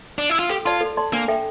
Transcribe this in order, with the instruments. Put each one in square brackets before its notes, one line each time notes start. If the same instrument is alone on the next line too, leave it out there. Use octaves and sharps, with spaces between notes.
[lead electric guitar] D4
E4
F4
[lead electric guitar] G4 [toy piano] A4
[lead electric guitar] F4 [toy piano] D5 A5 C6
[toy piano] A4
D5 A5 C6
[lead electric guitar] A#3 [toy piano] D4
[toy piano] A4 E5 G5